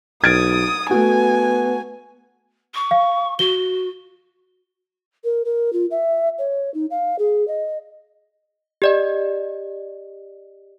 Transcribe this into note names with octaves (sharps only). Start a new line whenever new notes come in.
B1 D#6 G#6 A6 D7
A3 B3 F#4 G#5
C#6
F5
F#4 G7
A#4
A#4
F4
E5
C#5
D#4
F5
G#4
D#5
G4 D5 D#5